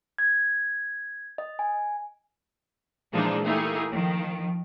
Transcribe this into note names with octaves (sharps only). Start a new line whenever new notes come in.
G#6
D#5
G#5
A#2 E3 F3 G#3 D4 D#4
A3 A#3 D#4 E4 G4 G#4
D#3 F3